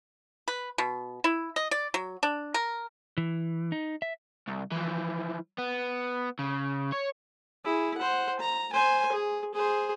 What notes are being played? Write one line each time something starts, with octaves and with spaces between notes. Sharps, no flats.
B4
B2
E4
D#5
D5
F#3
D4
A#4
E3
D#4
E5
C2
E3 F3
B3
C#3
C#5
E4 G#4
C5 F#5
A#5
C5 G#5
G#4
G#4 C5